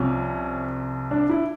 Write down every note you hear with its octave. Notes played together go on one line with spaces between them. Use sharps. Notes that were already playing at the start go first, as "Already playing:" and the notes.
Already playing: C2 C3 F3 C#4
D4
E4